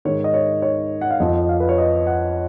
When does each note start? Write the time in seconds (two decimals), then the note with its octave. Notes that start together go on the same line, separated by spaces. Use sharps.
0.05 G#2 D#3 C#5
0.24 D#5
0.34 C#5
0.62 C#5
1.01 F#5
1.11 F5
1.20 F2 F3 D#5
1.49 F5
1.60 B4
1.69 C#5
1.78 D#5
2.07 F#5